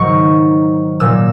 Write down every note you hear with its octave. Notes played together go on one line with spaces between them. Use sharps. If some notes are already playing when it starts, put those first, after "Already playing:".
Already playing: G#2 D#3 F#3 C#6
A#2 F#3 E6